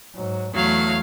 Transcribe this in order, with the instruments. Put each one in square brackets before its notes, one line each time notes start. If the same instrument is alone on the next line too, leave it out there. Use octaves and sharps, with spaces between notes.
[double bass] G#2 F#3
[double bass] E2 A3 [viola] F#3 F5